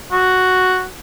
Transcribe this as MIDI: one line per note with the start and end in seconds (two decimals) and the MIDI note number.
0.12 0.85 66